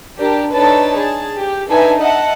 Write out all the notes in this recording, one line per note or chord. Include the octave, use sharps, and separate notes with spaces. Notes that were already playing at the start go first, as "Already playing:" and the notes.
D4 G4 A#4
D4 D#4 A4 B4 C#5 A5
G#4 A5
G4
D4 D#4 A4 B4 E5 G#5
D#5 E5 F#5 A5